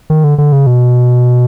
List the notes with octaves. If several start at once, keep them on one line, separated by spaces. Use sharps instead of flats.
D#3
D3
D3
C#3
B2